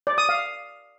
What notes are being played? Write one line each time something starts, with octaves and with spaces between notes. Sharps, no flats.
D5
D#6
F5